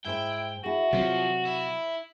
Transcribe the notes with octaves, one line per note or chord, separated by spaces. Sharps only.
G#2 E4 C5 G5
E4 F#4 G#4
C3 F3 F#3 F4 C5
E4